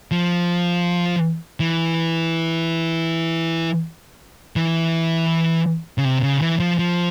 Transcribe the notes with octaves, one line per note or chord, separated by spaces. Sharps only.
F3
E3
E3
C#3
C3
C#3
E3
F3
F3